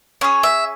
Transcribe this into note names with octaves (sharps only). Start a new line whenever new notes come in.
C#4 G#4 C#5
E5